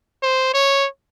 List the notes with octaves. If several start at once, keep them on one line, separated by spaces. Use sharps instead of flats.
C5
C#5